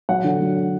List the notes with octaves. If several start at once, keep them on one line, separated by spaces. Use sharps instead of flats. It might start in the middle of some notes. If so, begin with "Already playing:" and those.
F#3 F#5
D3
F#3